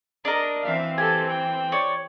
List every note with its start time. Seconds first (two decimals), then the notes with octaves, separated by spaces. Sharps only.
0.25 D4 A#4 D#5
0.62 E3 C4 E5 F5
0.98 G4 A4 G#5
1.29 G5
1.72 C#5 D5